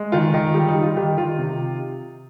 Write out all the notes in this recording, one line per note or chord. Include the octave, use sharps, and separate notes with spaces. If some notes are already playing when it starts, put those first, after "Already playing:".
Already playing: G#3
D#3 F4
D#3
G3 G4
D#4
G3
F4
D#3 G4
D#3 F4
C3